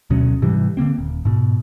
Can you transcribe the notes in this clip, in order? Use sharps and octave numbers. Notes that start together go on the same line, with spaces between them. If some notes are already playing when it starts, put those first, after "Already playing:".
D2 B2 F#3 C#4
G#2 C3 E3 G3
D3 E3 A#3 C4
D#1
G#2 B2